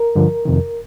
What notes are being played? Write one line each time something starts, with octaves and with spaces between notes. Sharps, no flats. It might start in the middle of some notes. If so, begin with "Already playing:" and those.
Already playing: A#4
G2 D3 F3
F2 C3 D#3